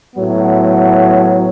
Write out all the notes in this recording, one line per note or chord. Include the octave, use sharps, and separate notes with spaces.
A2 F#3 B3